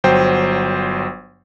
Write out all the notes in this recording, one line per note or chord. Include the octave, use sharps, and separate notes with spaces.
G1 F#3 C5 G5